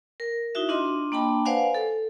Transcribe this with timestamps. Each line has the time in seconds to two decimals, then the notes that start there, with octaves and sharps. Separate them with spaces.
0.20 A#4
0.55 D#4 E4 F#4 E5
0.69 D4 F4 D#5 C6
1.12 A#3 D4 G5 A5 B5
1.45 B4 C5 D5 F5 F#5 G#5
1.75 A4